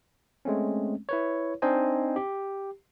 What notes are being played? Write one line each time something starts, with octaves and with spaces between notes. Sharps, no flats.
G#3 A3 C4 C#4
E4 B4 C#5
C4 D4 D#4 C5 D#5 G#5
G4